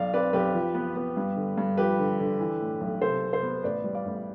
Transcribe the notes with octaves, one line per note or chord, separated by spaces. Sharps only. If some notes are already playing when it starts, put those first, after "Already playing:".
Already playing: B1 D5 F5
C4 B4 D5
B1 G4 B4
F3
B3
B3
G2
D3
G2
F3 G4 B4
D3
D3
E3
A2
B1
C3 A4 C5
C3
A4 C5
B3
A1 B4 D5
G3
D5 F5
A1